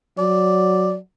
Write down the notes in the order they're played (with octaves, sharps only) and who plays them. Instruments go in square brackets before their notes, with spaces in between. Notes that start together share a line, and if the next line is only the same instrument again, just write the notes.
[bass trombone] F#3 [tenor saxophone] D5